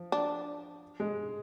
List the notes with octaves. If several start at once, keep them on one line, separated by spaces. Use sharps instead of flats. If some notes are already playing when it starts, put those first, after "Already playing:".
Already playing: F3
D4
G#3